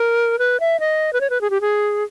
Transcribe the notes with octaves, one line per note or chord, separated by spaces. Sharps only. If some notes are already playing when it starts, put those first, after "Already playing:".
Already playing: A#4
B4
E5
D#5
B4
C#5
B4
G#4
G4
G#4